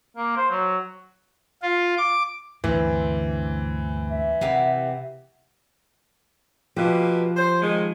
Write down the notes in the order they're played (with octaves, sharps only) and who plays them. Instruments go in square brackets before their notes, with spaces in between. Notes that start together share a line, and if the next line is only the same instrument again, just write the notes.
[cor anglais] A#3
C5
F#3
[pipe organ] F4
D6
[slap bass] D2 G2 D3 [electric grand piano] E3 [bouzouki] C4
[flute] E5
[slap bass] C3 [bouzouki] G4 A#4 F#5
[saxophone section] B2 A#3 B4 [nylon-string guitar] F3 G4
[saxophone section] C5
D#3 G#3